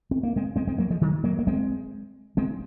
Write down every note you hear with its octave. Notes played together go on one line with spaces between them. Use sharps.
C4
A#3
G#3 C4
G#3 C4
G#3 C4
F#3 A#3
F3 G#3
D#3 F#3
F#3 A#3
A#3
G#3 C4
G#3 C4